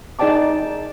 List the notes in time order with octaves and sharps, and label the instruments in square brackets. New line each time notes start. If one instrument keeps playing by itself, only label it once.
[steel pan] D#4 G#4 D5 G5 A5 D6